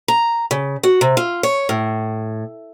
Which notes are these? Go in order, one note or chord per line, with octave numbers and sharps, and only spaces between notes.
A#5
C#3
F#4
C3
F4
C#5
A2